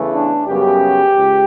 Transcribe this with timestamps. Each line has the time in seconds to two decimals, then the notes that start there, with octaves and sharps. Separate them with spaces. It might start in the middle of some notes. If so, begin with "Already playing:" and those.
Already playing: E2 C#3 E3 A3
0.12 D4
0.47 F#2 C#3 G3 B3 G4
1.17 C#2